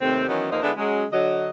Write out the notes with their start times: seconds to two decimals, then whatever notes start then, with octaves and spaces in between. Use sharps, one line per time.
0.01 D#2 C3 A3 C4
0.28 D#3 E3 F#3 B3 C#4
0.51 E2 F3 A#3 D#4 C5 D#5
0.63 D3 G#3 B3 D4 E4
0.76 F#3 G#3 C#4
1.12 D3 F#3 D#5